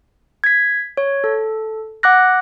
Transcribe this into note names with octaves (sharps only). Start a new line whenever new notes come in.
G#6 B6
C#5
A4
F#5 D6 F#6 A#6